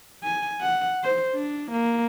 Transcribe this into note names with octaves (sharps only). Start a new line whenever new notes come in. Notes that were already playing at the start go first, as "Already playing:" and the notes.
G#5
F#5
C5
D4
A#3